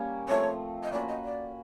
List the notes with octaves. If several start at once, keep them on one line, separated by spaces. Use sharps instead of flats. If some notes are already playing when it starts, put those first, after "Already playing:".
Already playing: G3 A#3 C#4
F3 A3 C4 C#5
D#5
A#3 C#4 F#4 B4 D5
D#5
D5